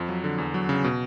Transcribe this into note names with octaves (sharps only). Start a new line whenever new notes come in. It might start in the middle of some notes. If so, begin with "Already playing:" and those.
Already playing: F2 F3
F#3
D3
E2
F#3
C#3
B2